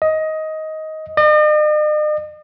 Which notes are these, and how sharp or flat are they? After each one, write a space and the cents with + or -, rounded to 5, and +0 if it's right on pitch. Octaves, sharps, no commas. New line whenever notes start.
D#5 +15
D#5 -45